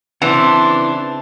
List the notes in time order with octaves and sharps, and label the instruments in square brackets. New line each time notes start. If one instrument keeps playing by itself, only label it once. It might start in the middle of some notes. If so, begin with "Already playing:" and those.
[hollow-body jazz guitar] C#3 C4 [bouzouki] E3 [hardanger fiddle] D4 C6